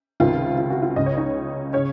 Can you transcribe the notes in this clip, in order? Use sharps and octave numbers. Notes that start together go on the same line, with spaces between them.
C#2 C3 D#3 F4
F4
F#4
F4
C#2 C#3 D#5
C#5
D#4 D#5
C#3 C#4 C#5